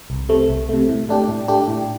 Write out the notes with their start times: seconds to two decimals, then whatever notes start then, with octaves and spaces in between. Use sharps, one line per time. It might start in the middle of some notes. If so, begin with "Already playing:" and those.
0.10 C2
0.29 C3 A3
0.49 C2
0.69 C3 A3
0.88 A2
1.09 A3 D4 G4
1.28 A2
1.48 A3 D4 G4
1.68 A2